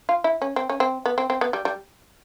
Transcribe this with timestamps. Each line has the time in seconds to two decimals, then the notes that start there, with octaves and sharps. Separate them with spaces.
0.09 F4
0.24 E4
0.42 C#4
0.56 C4
0.70 C#4
0.80 C4
1.06 B3
1.18 C4
1.30 C4
1.41 B3
1.53 G3
1.65 G3